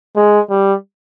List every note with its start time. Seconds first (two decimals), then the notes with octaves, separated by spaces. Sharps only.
0.16 G#3
0.50 G3